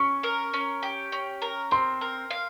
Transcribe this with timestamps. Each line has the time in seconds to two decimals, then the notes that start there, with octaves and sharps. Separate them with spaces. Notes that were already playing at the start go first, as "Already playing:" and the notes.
Already playing: C#4 C#6
0.23 A#4
0.54 C#4
0.83 G4
1.12 C#4
1.42 A#4
1.71 C4 C6
2.01 A#4
2.31 F5